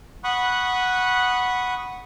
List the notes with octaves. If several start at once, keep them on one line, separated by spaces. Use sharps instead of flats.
F#5 B5 C#6 D#6 F#6